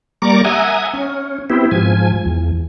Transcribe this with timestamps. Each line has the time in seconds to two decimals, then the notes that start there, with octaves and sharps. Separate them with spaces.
0.22 G3 A#3 D5 A#5 C#6 D6
0.45 E5 F#5 G#5 A#5 D#6
0.94 C#4
1.50 B3 C4 E4 G4
1.71 G#2 F3 G#5
2.25 E2